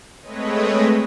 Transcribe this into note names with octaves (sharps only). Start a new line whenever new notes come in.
G#3 A3 C4 B4 C#5 D#5